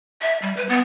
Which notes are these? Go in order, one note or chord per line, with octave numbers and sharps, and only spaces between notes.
E5
G3
B4
B3